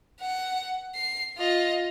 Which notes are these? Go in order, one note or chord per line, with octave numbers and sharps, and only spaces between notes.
F#5
C7
F4 D#5